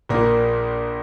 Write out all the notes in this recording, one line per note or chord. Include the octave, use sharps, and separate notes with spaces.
A#1 A#2 A#3